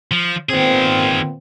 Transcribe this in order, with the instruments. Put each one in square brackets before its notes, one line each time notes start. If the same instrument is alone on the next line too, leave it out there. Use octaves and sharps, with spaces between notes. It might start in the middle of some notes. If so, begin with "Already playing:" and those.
[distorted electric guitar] F3
[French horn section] A#2 B3 C4 [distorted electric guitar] D#3 G#4